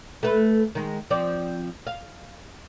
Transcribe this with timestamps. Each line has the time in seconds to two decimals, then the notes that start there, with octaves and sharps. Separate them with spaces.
0.23 A3 B4
0.75 D#3 G#3
1.10 F3 C4 D5
1.87 F5